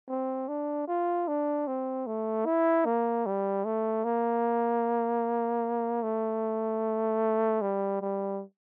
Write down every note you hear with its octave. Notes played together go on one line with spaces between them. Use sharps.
C4
D4
F4
D4
C4
A3
E4
A#3
G3
A3
A#3
A3
G3
G3